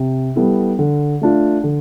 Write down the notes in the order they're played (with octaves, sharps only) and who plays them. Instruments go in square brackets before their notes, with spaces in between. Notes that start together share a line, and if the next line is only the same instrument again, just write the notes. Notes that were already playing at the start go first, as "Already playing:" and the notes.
Already playing: [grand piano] C3
G3 B3 E4 A4
D3
A3 D4 F4
D3